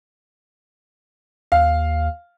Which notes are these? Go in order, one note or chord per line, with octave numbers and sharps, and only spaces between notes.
D#2 F5